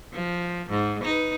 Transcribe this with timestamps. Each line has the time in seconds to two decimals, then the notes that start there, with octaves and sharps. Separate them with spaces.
0.13 F3
0.69 G#2
1.03 D#4 B4